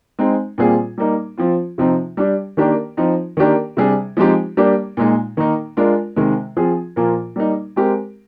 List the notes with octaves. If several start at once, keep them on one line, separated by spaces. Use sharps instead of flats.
G#3 C4 D#4
A#2 G3 C4 F4 G#4
G3 A#3 D#4
F3 C4 F4
C3 F3 C4 D#4
G3 D4 G4
D#3 A#3 D4 G4 A#4
F3 C4 D#4
D#3 A#3 D4 G4 A#4
C3 G3 D4 G#4
F3 G#3 C4 D#4 G4
G3 A#3 D4 G4
A#2 G#3 D#4
D#3 A#3 D#4
G#3 D4 F4 A#4
C3 D#3 G#3
F3 C4 F4 G#4
A#2 F3 A#3 F4 A#4
G3 A#3 D#4
G#3 C4 G4 A#4